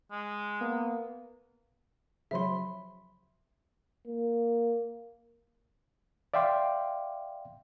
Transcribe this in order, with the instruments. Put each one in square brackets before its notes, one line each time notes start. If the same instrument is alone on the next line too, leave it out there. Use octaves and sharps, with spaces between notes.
[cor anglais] G#3
[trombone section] A#3 B3
[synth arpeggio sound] C#3 F3 F#3 [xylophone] E5 B5 C6
[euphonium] A#3
[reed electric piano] D5 E5 F5 G5 C6 D6